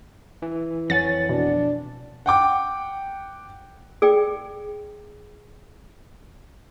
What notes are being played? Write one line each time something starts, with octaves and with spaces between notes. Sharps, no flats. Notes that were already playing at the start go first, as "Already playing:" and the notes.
E3
F2 C#5 F#5 G#5 A6
B2 D4
F#5 G5 D6
G#4 D5 G5